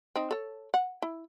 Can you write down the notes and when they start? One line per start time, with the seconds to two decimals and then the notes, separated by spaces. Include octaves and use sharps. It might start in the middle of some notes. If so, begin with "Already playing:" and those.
0.16 C4 D#4
0.31 A4 C#5
0.74 F#5
1.02 E4